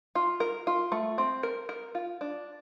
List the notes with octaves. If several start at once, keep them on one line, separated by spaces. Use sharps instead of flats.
F4
A#4
F4
A3
C4
A#4
A#4
F4
D4